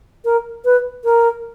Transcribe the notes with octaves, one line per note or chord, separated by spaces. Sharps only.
A#4
B4
A#4